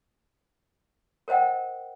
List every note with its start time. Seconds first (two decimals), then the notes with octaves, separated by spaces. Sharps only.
1.28 A#4 C5 D#5 F#5 G5